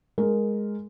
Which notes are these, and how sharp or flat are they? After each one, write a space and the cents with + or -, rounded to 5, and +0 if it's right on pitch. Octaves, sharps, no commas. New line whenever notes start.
G#3 +0 A#4 +0